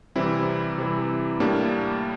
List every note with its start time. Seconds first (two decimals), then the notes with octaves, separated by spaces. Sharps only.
0.16 C3 E3 G3 C4 E4
0.78 C3 E3 G3
1.40 A2 G3 A#3 D4